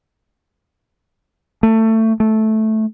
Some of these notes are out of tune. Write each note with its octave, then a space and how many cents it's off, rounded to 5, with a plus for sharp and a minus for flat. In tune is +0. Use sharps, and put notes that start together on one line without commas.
A3 +20
A3 -10